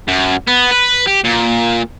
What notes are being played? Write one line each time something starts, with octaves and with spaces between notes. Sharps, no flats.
F#2
B3
B4
G4
A#2